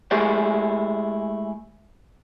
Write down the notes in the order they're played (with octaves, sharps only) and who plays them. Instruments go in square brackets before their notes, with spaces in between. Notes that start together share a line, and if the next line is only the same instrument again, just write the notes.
[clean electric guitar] G#3 A3 E4 G4 G#4 D5